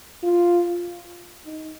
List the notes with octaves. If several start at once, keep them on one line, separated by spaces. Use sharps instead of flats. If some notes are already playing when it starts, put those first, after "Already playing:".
F4
D#4